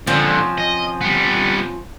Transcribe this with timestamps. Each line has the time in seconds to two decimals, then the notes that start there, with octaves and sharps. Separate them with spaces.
0.07 A#2 D3 F3 C4 C#4
0.58 D#5
1.01 G3 B3